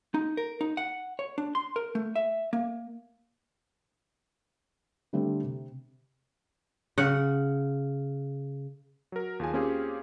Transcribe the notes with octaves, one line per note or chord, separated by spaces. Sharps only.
D#4
A#4
D#4
F#5
C#5
D4
C6
A#4
A3
E5
A#3
D3 G3 A3 C4 D4
C3
C#3 F#5
F#3 A#4
D#2 F4 G#4 G#5
A#3 C4 C#4 F4 G4 G#4